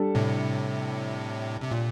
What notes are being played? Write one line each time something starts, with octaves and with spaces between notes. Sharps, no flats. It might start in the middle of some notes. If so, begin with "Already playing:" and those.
Already playing: G3 D4 A4
A2 C3
C3
A#2